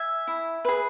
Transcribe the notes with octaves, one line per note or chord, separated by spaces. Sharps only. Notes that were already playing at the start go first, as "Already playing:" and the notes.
Already playing: E5 G#5
E4
G#4 B4